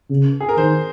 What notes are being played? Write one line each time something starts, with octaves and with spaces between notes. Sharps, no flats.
C#3
G#4
A#4
D#3 C5